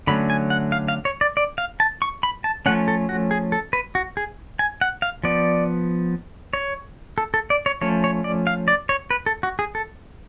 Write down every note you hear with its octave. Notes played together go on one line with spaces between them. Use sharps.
D3 F#3 A3 C#4 B5
G#5
F#5
F5
F5
C#5
D5
D5
F5
A5
C#6
B5
A5
F3 A3 C#4 F#5
A4
F#4
G#4
A4
B4
F#4
G#4
G#5
F#5
F5
F3 B3 D5
C#5
A4
A4
D5
C#5
F3 A3 C#4 C#5
C#5
D5
F5
D5
C#5
B4
A4
F#4
G#4
A4